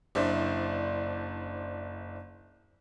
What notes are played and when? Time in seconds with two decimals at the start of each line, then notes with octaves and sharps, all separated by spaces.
0.15 F#1 D4 E4 C5 D5